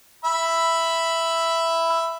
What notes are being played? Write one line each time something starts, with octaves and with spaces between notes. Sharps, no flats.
E5 B5